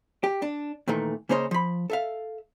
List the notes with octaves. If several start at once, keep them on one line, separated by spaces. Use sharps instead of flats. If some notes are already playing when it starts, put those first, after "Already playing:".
G4
D4
A#2 D#3 E3 A3
C#3 A#3 C#4 C5 C#5 D#5
F3 B5
A4 E5 F5